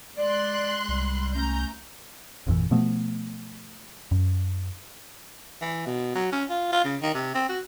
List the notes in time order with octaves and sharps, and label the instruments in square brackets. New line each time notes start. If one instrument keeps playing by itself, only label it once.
[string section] G#3 C6 F#6 [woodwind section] D5
[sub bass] C2 [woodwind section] G3
[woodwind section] A3 C#4 [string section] A#5 G6
[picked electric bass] G#1 F2 A#2 E3
B2 F3 A3 B3
F#2
[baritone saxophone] E3
B2
F#3
C#4
F4
F4
C#3
D#3
C3
C4
F#4